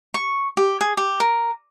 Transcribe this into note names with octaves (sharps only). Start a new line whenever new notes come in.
C#6
G4
G#4
G4
A#4